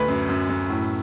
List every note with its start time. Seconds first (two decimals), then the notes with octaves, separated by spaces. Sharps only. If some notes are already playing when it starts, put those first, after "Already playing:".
Already playing: D2 B4
0.08 F#2
0.29 F#2
0.49 F#2
0.70 A2